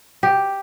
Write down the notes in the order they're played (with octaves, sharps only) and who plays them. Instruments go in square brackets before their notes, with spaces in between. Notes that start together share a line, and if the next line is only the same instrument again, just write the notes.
[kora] G4